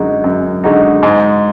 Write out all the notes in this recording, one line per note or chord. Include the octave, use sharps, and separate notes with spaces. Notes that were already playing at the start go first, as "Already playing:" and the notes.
Already playing: F#2 D3 G#3 D#4 F#4
F#2
D3 G#3 D#4 F#4
G#2